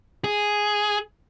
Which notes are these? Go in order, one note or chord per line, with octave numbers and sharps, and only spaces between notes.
G#4